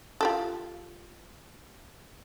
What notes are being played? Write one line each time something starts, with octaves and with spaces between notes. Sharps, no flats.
F4 G4 A4